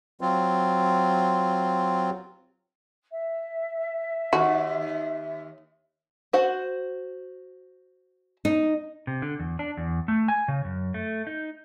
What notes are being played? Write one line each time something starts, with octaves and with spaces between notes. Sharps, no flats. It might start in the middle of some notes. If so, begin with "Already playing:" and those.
F#3 C4 F4
E5
D#2 F#4
F#4 C5 F#5
D#4
C3
D3
E2
D4
E2
A3
G#5
C#3
F#2
A3
D#4